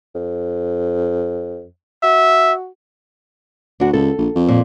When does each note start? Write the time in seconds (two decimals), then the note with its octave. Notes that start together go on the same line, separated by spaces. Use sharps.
0.15 F2
2.03 F#4 E5
3.80 D2 D4 F#4
3.93 C#2 A4
4.18 A#1
4.35 F2
4.48 A#2